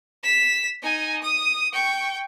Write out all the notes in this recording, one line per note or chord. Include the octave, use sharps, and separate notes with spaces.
B6 E7
D#4 G#5
D#6
G5 C#6